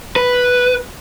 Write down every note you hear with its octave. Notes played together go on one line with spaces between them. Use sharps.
B4